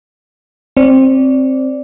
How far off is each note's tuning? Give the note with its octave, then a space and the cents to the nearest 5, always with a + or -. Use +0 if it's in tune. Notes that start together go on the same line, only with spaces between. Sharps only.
C4 +15 D5 -10